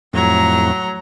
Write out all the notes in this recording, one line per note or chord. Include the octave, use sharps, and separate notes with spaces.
F2 A2 F#3 A#5